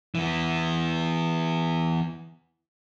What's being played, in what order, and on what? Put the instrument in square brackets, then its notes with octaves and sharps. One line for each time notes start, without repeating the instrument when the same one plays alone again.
[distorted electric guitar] E3 B3